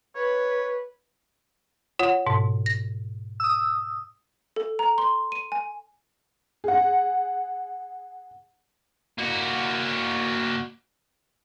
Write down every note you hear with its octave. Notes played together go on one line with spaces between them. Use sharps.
B4 C#5
F4 C#5 F#5
G#2 B2
A#6
D#6 E6
A4
A#5
C6
D#7
G#5
G#4 F#5
A#3 F#4